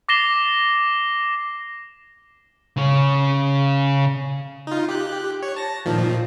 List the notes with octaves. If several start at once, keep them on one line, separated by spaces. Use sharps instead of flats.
D6 A6 A#6 C7 E7 G7
C#3 C#4
D#4 F4
G4 F#6
C#5
A5 A#6
A#2 D#3 F3